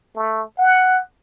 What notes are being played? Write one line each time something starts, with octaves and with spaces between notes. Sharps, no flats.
A3
F#5